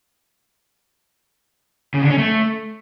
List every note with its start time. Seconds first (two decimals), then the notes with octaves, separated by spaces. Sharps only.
1.94 C#3
2.02 D3
2.10 C#4
2.18 A3